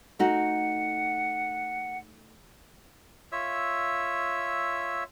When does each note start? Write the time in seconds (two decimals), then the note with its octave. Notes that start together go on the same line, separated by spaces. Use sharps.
0.19 A3 D#4 F#4 F#5
3.32 F4 C#5 E5 E6